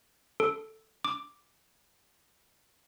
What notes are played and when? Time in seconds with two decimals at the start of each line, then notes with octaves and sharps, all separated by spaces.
0.40 A4
1.05 D6